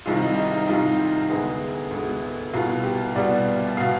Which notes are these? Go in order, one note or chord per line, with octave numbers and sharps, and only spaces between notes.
C2 C3 D#3 G3 F4
D#4
D#4
D#4
C2 C3 D#3 G3 F4
D2 D3 G#3 B3 G#4
D2 D3 G#3 B3
C2 B2 G3 B3 F4
G4
C2 B2 G3 B3 D5
B2 B3 F5